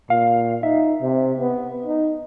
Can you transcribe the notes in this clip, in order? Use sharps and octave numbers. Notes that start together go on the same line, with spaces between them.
A#2 F5
D#4 E5
C3
B3
D#4